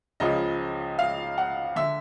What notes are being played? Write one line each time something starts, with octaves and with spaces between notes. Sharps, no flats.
C#2 C#3 F3 D#5
F5
F#5
D3 E5